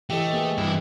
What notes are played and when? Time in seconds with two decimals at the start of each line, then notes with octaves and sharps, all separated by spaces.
0.10 E3 A3 G4 A4 D#5
0.32 A#3 B3 G#4
0.58 G2 E3 E4